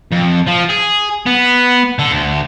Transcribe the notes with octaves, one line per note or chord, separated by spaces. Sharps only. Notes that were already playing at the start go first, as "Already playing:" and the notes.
F2
F3
G#4
B3
D3
D2